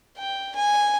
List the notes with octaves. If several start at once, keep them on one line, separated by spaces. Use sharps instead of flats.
G5
G#5